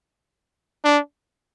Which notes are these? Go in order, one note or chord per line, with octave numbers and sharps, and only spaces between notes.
D4